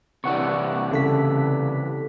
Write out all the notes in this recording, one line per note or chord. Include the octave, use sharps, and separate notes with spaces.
C3 E3 D4 F#5 C#6
C#3 A4 B6